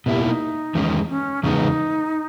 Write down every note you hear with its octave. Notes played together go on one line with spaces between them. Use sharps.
B2 A#3 E4 G4
D#4
E2 D#3 G#3 C#4
C#4
E2 C#3 G#3 B3 D#4